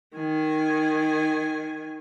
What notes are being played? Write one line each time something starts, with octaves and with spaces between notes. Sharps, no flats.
D#3 G#5